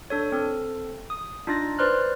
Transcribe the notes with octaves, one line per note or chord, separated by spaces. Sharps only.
D4 A4 C#5
C4 A4
D#6
D4 D#4 F4 A6 A#6
B4 C5 D5 C6 F6 F#6